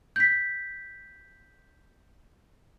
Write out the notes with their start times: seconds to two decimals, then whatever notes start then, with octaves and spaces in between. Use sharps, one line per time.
0.16 G6 B6